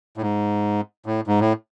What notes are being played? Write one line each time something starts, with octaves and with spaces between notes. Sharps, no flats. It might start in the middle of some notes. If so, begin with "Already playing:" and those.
A2
G#2
A2
G#2
A2